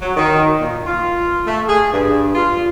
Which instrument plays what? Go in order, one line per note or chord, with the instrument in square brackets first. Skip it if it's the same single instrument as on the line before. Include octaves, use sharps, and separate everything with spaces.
[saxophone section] F#3
D#3
A#2
F4
A3
G#4
G2
F4